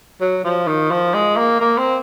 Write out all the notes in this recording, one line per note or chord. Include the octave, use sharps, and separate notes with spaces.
F#3
F3
D#3
F3
G#3
A#3
A#3
C4